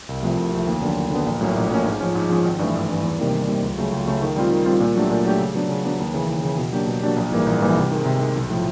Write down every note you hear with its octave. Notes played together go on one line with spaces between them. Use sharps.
C2
C3 F3 A3
C2
C3 F3 A3
D#2
D3 F#3 B3
D#2
D3 F#3 B3
A#1
A2 F#3 A#3 C#4
A#1
A2 F#3 A#3 C#4
G#2
F3 G#3 C#4
G#2
F3 G#3 C#4
G#1
G2 E3 A3
G#1
G2 E3 A3
E2
C3 D#3 G3 A#3
E2
C3 D#3 G3 A#3
C#2
C#3 F#3 A3
C#2
C#3 F#3 A3
D#3
G3 C4 F4
D#3
G3 C4 F4
A#2
F#3 A3 D4 G4
A#2
F#3 A3 D4 G4
C#3
F#3 B3 D4
C#3
F#3 B3 D4
D#2
C#3 E3
D#2
C#3 E3
B2
F#3 A#3 D4 G4
B2
F#3 A#3 D4 G4
A#1
G#2 E3 G3 A#3
A#1
G#2 E3 G3 A#3
C3
D#3 G#3
C3
D#3 G#3
B1
A2 F3